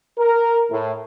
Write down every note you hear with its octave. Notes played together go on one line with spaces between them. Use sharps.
A#4
A2